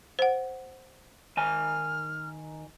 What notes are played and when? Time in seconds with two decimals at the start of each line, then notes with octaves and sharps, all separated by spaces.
0.19 C5 F#5
1.37 D#3 G#5 F6